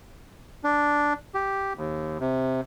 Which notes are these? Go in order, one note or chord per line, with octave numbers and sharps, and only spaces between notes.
D4
G4
D#2
C3